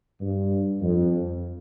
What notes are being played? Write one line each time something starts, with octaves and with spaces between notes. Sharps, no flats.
G2
F2